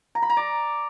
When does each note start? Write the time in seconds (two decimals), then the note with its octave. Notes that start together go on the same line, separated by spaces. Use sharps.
0.15 A#5
0.22 B5
0.30 A#5
0.37 D5